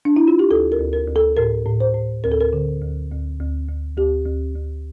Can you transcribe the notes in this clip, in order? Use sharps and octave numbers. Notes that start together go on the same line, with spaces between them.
D4
E4
F4
G4
D2 A4
A#4
D2
A#4
D2
A4
A2 A#4
A2
C5
A2
D2 A#4
A4
A#4
D3
D2
D2
D2
D2
D2 G4
D2
D2